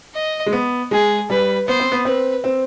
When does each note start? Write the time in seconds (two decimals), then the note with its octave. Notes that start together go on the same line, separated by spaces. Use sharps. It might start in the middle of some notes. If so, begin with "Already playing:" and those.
0.14 D#5
0.46 G#3
0.53 B3
0.91 G#3 G#4
1.30 G3 B4
1.67 B3 C5
1.80 C4
1.92 B3
2.05 C4 B4
2.44 C4